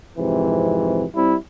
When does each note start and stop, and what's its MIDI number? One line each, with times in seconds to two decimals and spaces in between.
0.17 1.05 41
0.17 1.05 44
0.17 1.05 48
0.17 1.05 52
1.15 1.35 55
1.15 1.35 60
1.15 1.35 64